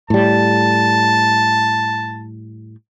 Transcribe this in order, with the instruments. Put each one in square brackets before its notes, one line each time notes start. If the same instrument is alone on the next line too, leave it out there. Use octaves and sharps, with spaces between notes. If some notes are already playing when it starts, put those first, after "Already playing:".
[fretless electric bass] A2 G3 [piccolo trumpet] A5